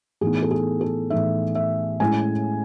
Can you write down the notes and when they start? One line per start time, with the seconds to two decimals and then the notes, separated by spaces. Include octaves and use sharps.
0.21 A2 E3 B3 D#4 G#4
0.42 A4
0.51 G#4
0.81 A4
1.10 A2 E3 B3 D#4 E5
1.55 E5
2.00 A2 G#3 C#4 E4 G#5